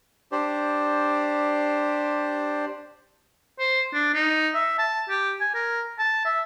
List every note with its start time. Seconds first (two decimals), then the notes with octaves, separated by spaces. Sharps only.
0.32 D4 G4 C5 D5
3.59 C5
3.94 D4
4.14 D#4
4.54 E5
4.79 A5
5.10 G4
5.40 G#5
5.55 A#4
5.99 A5
6.25 E5